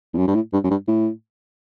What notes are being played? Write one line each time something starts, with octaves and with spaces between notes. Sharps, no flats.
E2
F#2
G2
A2
G2
F#2
G2
A2